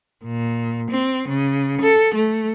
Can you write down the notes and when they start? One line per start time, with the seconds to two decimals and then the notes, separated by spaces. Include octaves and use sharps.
0.24 A#2
0.91 C4
1.29 C#3
1.82 A4
2.15 A3